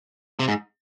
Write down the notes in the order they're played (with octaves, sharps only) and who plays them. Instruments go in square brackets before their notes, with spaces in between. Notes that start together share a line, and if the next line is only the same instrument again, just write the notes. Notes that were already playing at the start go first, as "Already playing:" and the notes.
[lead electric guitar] C3
G#2